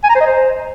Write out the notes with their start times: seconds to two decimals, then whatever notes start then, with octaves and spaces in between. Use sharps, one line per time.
0.04 G#5
0.09 A#5
0.15 C5
0.21 D#5
0.26 C5